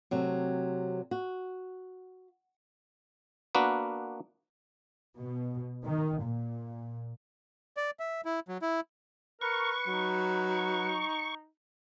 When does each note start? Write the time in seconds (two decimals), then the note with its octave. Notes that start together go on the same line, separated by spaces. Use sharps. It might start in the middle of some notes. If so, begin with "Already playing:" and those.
0.11 C3 F#3 A3 C4
1.11 F#4
3.55 A#3 B3 D4 F#4 A#4 B4
5.18 B2
5.84 D#3
6.22 A#2
7.77 D5
8.00 E5
8.25 E4
8.48 F#3
8.62 E4
9.41 A#4 B4 C#6
9.87 F#3 D#4